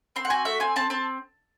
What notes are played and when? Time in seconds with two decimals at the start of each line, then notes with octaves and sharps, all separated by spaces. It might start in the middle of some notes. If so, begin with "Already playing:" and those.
0.16 C4 C6
0.25 F#5
0.30 F#4 G#5
0.45 A3 E5
0.60 C4 G#5
0.76 C4 A5
0.90 C4 A5